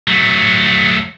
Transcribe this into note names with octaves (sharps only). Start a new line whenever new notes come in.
F#3 A3